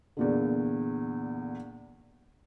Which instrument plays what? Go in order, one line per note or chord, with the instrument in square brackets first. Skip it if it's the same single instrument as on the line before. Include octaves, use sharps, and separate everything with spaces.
[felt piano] E2 A#2 D3